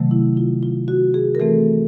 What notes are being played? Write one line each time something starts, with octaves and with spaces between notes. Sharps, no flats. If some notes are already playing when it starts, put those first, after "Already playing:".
Already playing: C3 D#3 F#3 A3
E4
F4
F4
F#4
G#4
A#4
E3 A3 C4 A4